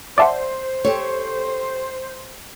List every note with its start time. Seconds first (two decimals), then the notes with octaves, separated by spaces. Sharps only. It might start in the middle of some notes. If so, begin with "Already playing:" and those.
0.18 C5 D5 E5 F#5 A5 C6 D6
0.85 G4 A4 C#5